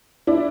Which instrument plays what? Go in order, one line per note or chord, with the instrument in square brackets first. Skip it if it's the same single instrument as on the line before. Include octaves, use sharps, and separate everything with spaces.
[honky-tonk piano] D4 E4